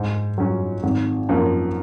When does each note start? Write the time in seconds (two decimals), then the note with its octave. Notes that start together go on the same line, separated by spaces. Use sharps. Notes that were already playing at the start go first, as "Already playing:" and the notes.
Already playing: G#2
0.38 F#3 C#4 F#4
0.83 G#1
1.29 F#2 F3 A#3